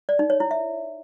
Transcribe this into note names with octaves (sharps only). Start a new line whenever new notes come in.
D5
D#4
C#5
E4
E5